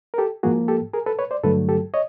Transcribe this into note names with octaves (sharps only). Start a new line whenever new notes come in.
A#4
G4 A4
G#2 F3 A#3 F#4 G#4
G4 A4
G#4 A#4
A4 B4
B4 C#5
C5 D5
G2 D3 F#3 A3 A4 B4
G4 A4
C#5 D#5